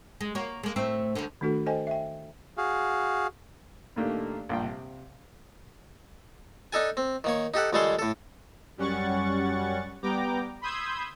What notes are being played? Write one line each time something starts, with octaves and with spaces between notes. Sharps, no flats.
G#3
A#3 F#4 C#5
G#3 A#3
A2 A3 C4
D2 D3
D#3 A3 D4 F#4 A4
A4 C5 D#5 G5 G#5
E5 G5
F#4 G#4 F5
A#2 D#3 A3 A#3 D4 G4
A#1 G2 A#2 F4 G5
C3
D4 D#4 A4 G#5
C4
D#3 A#3 C#5
D#4 G4 A4 F#5
C#2 D#3 G3 G#3 A4 C6
A2 A4
F#2 G3 C#4 F#5 C#6 A6
G3 B3 G5 A#5 D6
B5 C6 D#6 E6 G6 G#6